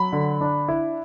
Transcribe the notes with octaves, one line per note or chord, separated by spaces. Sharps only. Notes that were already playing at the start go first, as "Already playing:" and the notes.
Already playing: F#3 B5
D3
D4
E4